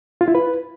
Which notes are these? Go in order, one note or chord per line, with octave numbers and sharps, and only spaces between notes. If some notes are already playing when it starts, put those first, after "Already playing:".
F4
E4
B4